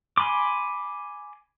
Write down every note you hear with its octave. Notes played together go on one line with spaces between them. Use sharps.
G#5 B5 C6 D6